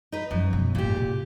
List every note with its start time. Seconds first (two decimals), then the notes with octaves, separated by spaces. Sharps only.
0.12 D#4 B4
0.31 F#2 F3 G3
0.53 B2
0.75 G#1 A#2 G4
0.97 C3